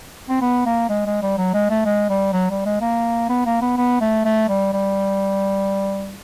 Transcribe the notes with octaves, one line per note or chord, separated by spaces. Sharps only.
C4
B3
A#3
G#3
G#3
G3
F#3
G#3
A3
G#3
G3
F#3
G3
G#3
A#3
B3
A#3
B3
B3
A3
A3
G3
G3